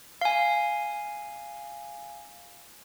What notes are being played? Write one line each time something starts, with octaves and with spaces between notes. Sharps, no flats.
F5 G#5